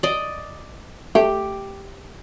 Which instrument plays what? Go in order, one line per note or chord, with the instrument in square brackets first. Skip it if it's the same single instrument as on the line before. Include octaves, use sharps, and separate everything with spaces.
[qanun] D5 D#5
[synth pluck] A3 [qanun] G4